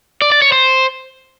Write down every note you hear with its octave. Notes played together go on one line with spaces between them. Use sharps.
D5
D5
C#5
C5